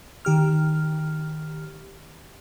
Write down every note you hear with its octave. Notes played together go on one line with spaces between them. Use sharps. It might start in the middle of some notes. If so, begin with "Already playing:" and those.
D#3 G4 F6